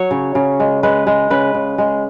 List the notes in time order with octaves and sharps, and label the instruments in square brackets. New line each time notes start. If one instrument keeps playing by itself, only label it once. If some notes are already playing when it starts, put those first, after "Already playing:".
Already playing: [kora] F#3 C#5
C#3
C#3
G#3
G#3 B4
G#3
C#3 B4
C#3
G#3